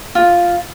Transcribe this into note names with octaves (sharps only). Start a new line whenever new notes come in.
F4